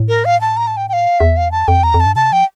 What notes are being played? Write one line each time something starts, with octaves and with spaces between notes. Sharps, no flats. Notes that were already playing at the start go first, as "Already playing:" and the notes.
Already playing: A2
A#4
F5
A5
A#5
A5
G5
G5
F5
E2 E5
F5
F2 A5
F2 G5
E2 A#5
F2
A5
G2
C3 A5
F3 G5